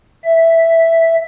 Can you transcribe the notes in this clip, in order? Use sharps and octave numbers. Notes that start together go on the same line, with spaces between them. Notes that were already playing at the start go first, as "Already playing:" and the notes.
E5